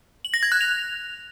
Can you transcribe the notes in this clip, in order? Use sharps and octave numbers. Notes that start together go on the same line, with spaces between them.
F#7
A#6
G#6
F#6
F7